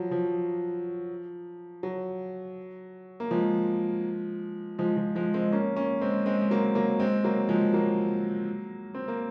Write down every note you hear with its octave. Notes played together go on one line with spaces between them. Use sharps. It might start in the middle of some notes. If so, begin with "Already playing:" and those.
Already playing: F3 F#3
F3
F#3
A#3
F3 G#3
F3 G#3
F3
F3 G#3
G#3 C4
A#3 C#4
A#3 C#4
G#3 C4
G#3 C4
G#3
F#3 A#3
F#3 A#3
G#3 C4
F#3 A#3
F3 G#3
F#3 A#3
C4
A#3